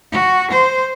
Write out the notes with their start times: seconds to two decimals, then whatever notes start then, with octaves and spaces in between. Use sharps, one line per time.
0.12 F#4
0.51 C5